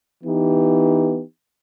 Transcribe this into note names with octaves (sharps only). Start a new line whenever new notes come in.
E3 B3 D#4 G4